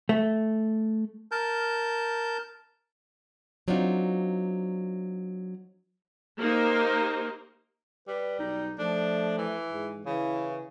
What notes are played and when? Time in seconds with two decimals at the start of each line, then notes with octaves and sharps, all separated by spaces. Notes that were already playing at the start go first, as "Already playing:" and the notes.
0.09 A3
1.32 A#4 A5 G6
3.68 F#3 C4 D4 D#4 F4 F#4
6.39 A#3 D#4 G4 C5
8.08 G3 B4
8.39 B1 D#4
8.79 F3 A3 D4
9.38 E3
9.72 G#2
10.06 C#3 E3 E4